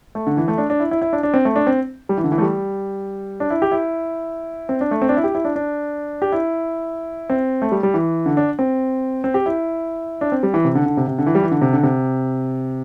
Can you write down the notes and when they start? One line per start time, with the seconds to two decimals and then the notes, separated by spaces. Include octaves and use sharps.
0.15 A3
0.27 D3
0.37 E3
0.48 A3
0.58 D4
0.70 D4
0.80 E4
0.91 E4
1.02 E4
1.13 D4
1.23 D4
1.34 C4
1.45 A3
1.56 D4
1.67 C4
2.09 G3
2.18 E3
2.24 D3
2.32 E3
2.38 A3
2.42 G3
3.40 D4
3.50 E4
3.62 G4
3.72 E4
4.69 C4
4.81 D4
4.91 A3
5.02 C4
5.09 D4
5.17 E4
5.24 G4
5.35 E4
5.45 D4
5.56 D4
6.22 G4
6.32 E4
7.30 C4
7.62 A3
7.72 G3
7.83 G3
7.94 E3
8.26 D3
8.37 D4
8.59 C4
9.24 C4
9.34 G4
9.46 E4
10.21 D4
10.32 C4
10.43 G3
10.54 E3
10.65 C3
10.75 D3
10.86 D3
10.97 C3
11.08 C3
11.19 D3
11.27 E3
11.35 G3
11.43 E3
11.51 D3
11.62 C3
11.73 D3
11.83 C3